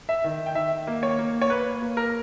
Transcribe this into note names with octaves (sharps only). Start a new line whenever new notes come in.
E5
D#3
G5
D#3 E5
A#3
C#5
A#3
C#5
A#3 B4
A#3
A#4